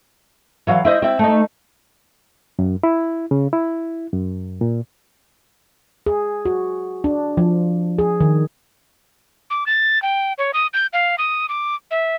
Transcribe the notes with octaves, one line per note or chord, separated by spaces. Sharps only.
E3 F#3 F5
E4 C5 D#5
C4 E4
A3 D#4
F#2
E4
C#3
E4
F#2
A#2
G#4
F#4
D4
F3
G#4
D#3
D6
A6
G5
C#5
D#6
G6
F5
D#6
D6
E5